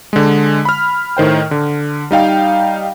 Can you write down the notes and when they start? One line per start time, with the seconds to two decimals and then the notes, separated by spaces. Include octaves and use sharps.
0.13 D3 G#3
0.65 B5 F6
1.17 A2 D#3 C5 G5
1.51 D3
2.11 G3 D#4 F5 G5